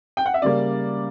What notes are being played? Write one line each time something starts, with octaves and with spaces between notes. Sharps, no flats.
G5
F#5
E5
C#3 G3 A#3 D5